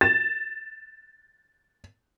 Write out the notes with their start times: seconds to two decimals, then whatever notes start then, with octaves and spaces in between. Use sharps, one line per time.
0.01 A6 E7